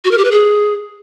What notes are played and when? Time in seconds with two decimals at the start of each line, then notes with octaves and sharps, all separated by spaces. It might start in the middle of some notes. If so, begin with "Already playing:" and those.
0.05 F#4
0.11 A#4
0.18 G4
0.25 B4
0.31 G#4